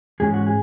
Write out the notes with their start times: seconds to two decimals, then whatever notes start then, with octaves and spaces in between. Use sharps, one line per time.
0.20 G#2 E3 G#3 C#4 G#4
0.34 F#4
0.47 G#4